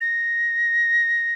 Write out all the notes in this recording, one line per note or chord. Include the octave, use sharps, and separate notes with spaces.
A#6